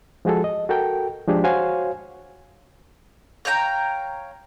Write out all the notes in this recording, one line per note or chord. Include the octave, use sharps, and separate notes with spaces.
F3 G#3 F#4 G#4 A4
D#5
F#4 A4 A#4 G5
F3 G#3 D4 G4 G#4
F#4 C5 C#5 F5 G#5
C#5 F5 G5 A#5